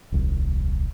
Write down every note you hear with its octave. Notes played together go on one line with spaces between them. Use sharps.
D#1 C2